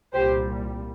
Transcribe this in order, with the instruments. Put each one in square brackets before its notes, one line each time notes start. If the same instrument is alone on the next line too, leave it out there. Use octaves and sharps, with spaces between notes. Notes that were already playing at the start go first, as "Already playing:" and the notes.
[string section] C2 A#2 G3 G4 C5